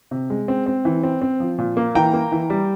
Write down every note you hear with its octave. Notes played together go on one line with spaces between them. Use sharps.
C3
G#3
C4
C4
E3
C4
C4
F3
A#2
A#3
E3 G5 A#5
A#3
E3
G3